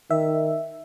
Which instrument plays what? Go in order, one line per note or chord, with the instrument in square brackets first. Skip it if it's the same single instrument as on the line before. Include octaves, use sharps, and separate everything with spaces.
[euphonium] D#3 [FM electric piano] E5